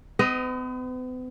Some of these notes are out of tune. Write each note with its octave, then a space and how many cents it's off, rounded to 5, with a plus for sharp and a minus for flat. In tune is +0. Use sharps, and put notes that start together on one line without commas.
B3 +45 D#5 +0